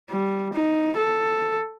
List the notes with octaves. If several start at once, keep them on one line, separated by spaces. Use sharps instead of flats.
G3
D#4
A4